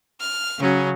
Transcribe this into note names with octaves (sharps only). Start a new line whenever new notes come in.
F6
C#3 F#3 C#4